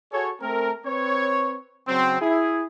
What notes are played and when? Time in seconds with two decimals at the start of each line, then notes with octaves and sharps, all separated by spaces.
0.12 F#4 G#4 A4 C#5
0.40 A3 C4 A#4
0.85 C4 B4 C#5
1.88 C#3 F#3 C4
2.21 E4 G#4